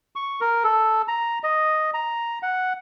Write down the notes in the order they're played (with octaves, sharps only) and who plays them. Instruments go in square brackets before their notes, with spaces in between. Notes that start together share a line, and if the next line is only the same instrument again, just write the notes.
[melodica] C#6
A#4
A4
A#5
D#5
A#5
F#5